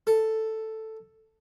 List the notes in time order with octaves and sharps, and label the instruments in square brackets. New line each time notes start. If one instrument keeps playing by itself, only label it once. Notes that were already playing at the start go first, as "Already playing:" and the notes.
[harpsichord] A4